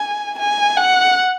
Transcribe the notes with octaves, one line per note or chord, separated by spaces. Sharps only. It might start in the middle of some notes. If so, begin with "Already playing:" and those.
Already playing: G#5
G#5
F#5